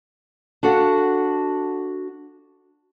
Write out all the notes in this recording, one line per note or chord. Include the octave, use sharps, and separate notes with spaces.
D4 F#4 A4 F5 F#5